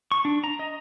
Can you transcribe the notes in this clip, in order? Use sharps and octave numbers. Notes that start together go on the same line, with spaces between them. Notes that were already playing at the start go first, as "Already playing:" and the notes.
C#6
D4
A#5
D#5